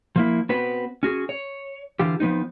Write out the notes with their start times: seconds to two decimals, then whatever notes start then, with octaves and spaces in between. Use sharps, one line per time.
0.16 F3 A#3 E4
0.49 B3 C4 F#4 B4
1.03 C#4 F#4 G#4
1.29 C#5
1.99 D3 E3 F4 G4
2.20 F3 B3 C4 D#4